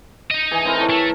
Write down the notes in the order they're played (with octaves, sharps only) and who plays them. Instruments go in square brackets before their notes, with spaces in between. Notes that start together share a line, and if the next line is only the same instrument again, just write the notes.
[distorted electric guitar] D#4 D#5
[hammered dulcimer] E3 G#4
C4 E4 A#4
A4 A#4 C#5
[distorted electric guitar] A3